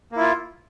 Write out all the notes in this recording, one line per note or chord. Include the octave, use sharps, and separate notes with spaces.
A#3 E4 F4